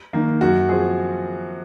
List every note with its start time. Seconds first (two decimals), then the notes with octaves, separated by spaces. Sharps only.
0.13 D#3 A#3
0.41 F#2 F#4
0.69 F3 C4 G#4